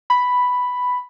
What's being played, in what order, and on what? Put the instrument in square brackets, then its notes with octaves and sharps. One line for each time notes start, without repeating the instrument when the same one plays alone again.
[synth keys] B5